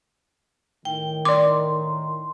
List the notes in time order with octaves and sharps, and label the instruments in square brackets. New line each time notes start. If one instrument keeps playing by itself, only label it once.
[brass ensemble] A2 D#3 [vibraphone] G5
[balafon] D5 D6 [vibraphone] C6